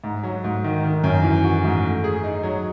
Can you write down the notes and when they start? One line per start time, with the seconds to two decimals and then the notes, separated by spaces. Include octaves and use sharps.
0.04 G#2
0.23 F#3
0.44 G#2
0.64 D#3
0.84 D#3
1.04 F#2
1.23 E3
1.43 F#4
1.64 G#2
1.84 A3
2.04 G#4
2.24 D#4
2.43 F#3